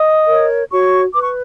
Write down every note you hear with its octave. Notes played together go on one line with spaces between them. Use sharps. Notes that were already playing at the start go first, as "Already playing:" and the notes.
Already playing: D#5 D#6
A#4 C#5
F#4 C#5 C#6
B4 D6
C#6